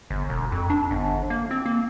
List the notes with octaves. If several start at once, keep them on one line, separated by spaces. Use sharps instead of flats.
G1
E1
F2
D4
G1
A#3
C4
A#3